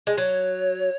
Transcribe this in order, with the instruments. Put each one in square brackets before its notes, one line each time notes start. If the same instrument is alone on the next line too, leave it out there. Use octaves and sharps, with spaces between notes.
[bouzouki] G#3
[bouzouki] F#3 [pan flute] C#5